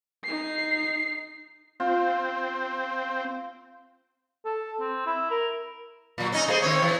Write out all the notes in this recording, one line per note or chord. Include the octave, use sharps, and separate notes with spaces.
D#4 C7
C4 F4
A4
C4
E4
A#4
A#2 F#3
C#4 D#4
A3 G#4 C5
D#3 C4 C#5
E3